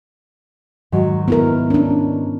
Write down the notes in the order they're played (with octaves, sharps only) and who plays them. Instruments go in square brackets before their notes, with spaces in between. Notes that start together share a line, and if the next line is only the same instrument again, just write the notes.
[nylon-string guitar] G#2 D#3 F#3
[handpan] B3 E4 A#4
C#4 D4